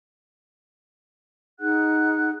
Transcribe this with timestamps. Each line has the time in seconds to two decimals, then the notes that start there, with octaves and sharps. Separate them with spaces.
1.59 D#4 G#4 F#5 F#6